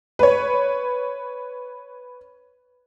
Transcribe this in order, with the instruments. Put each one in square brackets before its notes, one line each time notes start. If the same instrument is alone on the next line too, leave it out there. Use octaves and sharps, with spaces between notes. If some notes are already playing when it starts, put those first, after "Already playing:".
[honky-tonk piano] B4 C#5